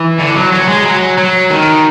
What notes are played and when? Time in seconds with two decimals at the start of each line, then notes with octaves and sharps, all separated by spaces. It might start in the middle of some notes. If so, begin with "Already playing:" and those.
Already playing: E3
0.19 D3
0.36 F#3
0.53 F#3
0.68 G#3
0.85 F#3
1.18 F#3
1.51 D#3